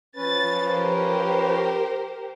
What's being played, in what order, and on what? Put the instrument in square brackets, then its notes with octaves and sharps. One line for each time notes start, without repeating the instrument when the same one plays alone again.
[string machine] F3 [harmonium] C#4 B4 [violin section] A6
[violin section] G4 A#4 C5